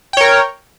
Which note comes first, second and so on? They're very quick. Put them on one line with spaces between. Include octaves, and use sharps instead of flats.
G5 C#5 A#4